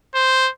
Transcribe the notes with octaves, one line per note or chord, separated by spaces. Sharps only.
C5